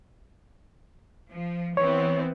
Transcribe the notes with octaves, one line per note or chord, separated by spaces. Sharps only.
F3
E3 B3 C4 C#5